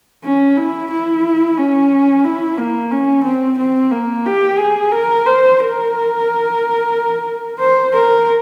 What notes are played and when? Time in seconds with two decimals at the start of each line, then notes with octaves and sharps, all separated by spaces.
0.24 C#4
0.57 E4
0.91 E4
1.58 C#4
2.25 E4
2.58 A#3
2.91 C#4
3.24 C4
3.58 C4
3.91 A#3
4.26 G4
4.58 G#4
4.92 A#4
5.26 C5
5.59 A#4
7.60 C5
7.94 A#4